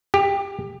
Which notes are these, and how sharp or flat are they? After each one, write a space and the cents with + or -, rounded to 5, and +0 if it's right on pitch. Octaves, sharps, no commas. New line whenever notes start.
G4 +20